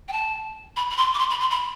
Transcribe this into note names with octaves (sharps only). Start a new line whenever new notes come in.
G5
A5
B5
B5
C6
D6
C6
B5
C6
B5